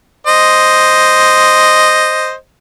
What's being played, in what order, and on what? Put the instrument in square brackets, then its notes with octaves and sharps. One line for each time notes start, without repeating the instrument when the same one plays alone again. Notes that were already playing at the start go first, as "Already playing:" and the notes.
[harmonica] C5 D#5